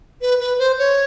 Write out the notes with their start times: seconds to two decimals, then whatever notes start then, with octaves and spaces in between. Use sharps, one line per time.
0.22 B4
0.40 B4
0.59 C5
0.79 C#5